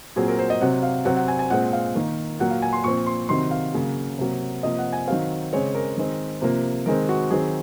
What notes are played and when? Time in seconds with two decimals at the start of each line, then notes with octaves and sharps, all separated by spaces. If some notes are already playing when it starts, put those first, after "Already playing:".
0.16 A#2 F#3 C4 G#4
0.28 A#4
0.39 C5
0.50 D#5
0.61 C3 F#3 C4 F#5
0.83 F5
1.05 C3 F#3 C4 F#5
1.17 F#5
1.28 G#5
1.39 G#5
1.50 A#2 G#3 C4 F#5
1.73 F5
1.95 D#3 A#3
2.39 A#2 F#3 A#3 F#5
2.50 F5
2.62 G#5
2.73 C6
2.84 A#2 F3 C4 C#6
3.06 C6
3.29 C3 D#3 F#3 C4 C6
3.51 F5
3.74 C#3 F#3 A#3
4.18 C3 F#3 A#3
4.63 C3 F3 A#3 D#5
4.78 F#5
4.93 G#5
5.07 D#3 F#3 C4 F5
5.53 C#3 G#3 C4 C#5
5.75 A#4
5.97 D#3 G#3 C4
6.42 C3 F3 A#3
6.86 D#3 G#3 C4 A#4
7.09 F#4
7.30 D#3 F#3 C4 G#4